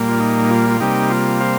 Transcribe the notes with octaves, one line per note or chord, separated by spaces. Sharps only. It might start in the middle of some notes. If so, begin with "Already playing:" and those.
Already playing: A#2 G3 A#3
F4
D#4
F4
F4
C3 G3 A#3 D#4 G4
F4
C5 F5